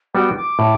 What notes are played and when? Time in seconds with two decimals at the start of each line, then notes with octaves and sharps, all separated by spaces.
0.14 G3 B3 F#4 G5
0.37 D6
0.59 A2